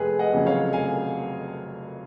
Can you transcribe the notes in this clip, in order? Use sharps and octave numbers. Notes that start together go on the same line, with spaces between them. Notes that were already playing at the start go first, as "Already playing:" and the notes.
Already playing: F1 G#4 B4
D#5 F#5
F2 C#3 F#3 C#4
C#5 F5
F1 F5 G#5